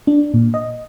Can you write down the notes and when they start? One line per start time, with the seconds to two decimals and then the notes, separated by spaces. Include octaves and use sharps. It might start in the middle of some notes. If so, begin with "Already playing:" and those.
0.07 D4
0.34 A#2
0.54 D#5